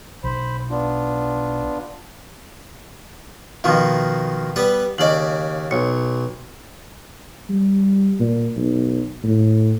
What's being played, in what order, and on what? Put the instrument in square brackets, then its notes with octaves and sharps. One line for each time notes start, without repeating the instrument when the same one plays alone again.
[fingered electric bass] B1 [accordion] C5 B5
[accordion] B3 D4 F4
[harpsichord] B2 D#3 F3 [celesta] F5
[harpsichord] G3 B3 B4
[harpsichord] D#2 C#3 D5 [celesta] D#5 F#7
[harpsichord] B1 [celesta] C#5 C#7
[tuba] G3
A#2
B1
A2